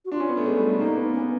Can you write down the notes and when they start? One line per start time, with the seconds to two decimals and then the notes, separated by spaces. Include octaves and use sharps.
0.05 F#4
0.12 D4 F4
0.20 C#4
0.29 B3
0.37 A3
0.46 G#3
0.57 G3
0.69 A3
0.79 A#3 D#4
0.97 B3
1.14 B3 C#4